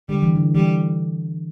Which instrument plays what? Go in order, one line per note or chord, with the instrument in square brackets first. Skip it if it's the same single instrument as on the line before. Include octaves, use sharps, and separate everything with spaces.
[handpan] D3 [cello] G3
[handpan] E3
D3
[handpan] E3 [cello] G3